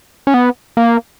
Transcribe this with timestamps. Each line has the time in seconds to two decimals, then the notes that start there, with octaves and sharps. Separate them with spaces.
0.27 C#4
0.34 B3
0.77 A#3